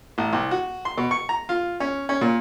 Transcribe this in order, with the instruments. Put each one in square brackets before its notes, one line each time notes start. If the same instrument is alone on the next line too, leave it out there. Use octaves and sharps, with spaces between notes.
[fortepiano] A1
C2
F#4
C6
B2
C#6
A#5
F4
C#4
C#4
A#2